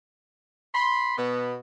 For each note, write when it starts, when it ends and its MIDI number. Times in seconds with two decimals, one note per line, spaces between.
0.75 1.17 83
0.75 1.17 84
1.17 1.56 47
1.17 1.56 59